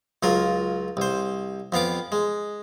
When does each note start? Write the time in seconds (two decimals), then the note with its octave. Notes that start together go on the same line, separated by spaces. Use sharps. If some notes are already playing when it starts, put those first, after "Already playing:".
0.23 C#2 F#3 F4 A#4
0.97 C2 C5
1.72 F2 B3 F5 D6
2.12 G#3